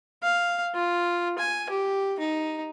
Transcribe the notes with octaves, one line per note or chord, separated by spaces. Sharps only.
F5
F4
G#5
G4
D#4